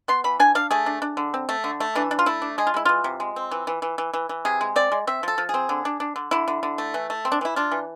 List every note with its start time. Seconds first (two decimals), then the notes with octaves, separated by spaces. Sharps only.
0.08 B3 C6
0.24 E3 B5
0.40 D4 G#5
0.55 D4 F5
0.71 A3 G#4
0.86 D4
1.02 D4
1.17 D3
1.34 C4
1.49 A3
1.64 D3
1.80 A3
1.95 E3 D4
2.11 D4
2.19 F4
2.26 A3 E4
2.42 D4
2.58 G#3 G#4
2.67 F4
2.74 G#3 E4
2.85 E3 F4
3.04 C3
3.20 G#3
3.36 C4
3.51 E3
3.67 E3
3.82 E3
3.98 E3
4.13 E3
4.29 E3
4.45 C3 G#4
4.61 G#3
4.76 C4 D5
4.92 G#3
5.07 C4 E5
5.23 F3 A4
5.38 F3
5.49 C4 G#4
5.69 D3
5.85 D4
6.00 D4
6.16 D3
6.31 D3 E4
6.48 D3
6.63 D3
6.78 A3
6.94 E3
7.10 A3
7.25 C4
7.32 D4
7.41 E3 E4
7.56 D4 F4
7.71 E3